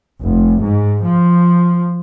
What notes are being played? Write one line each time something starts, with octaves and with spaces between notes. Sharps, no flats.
F1
G#2
F3